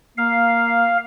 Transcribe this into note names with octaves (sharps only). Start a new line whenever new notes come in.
A#3 F5